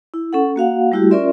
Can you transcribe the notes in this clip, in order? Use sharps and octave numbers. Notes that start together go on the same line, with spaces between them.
E4
C#4 A4 F#5
A#3 F#4 F5 F#5
G3 A3 E4 F#4 G4
C#4 F4 A#4 D5 E5 C6